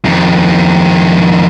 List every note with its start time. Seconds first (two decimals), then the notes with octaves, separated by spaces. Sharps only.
0.05 F2 D#3